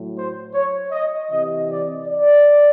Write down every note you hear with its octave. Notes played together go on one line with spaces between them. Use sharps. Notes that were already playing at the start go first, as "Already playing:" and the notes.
Already playing: A2 F#3
C5
C#5
D#5
C3 E3 D#5
D5
D5